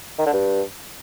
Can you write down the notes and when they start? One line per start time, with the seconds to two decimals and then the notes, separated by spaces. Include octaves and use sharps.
0.19 D#3
0.26 D3
0.33 G2